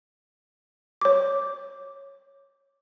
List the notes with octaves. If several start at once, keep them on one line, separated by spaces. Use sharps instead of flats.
C#5 D6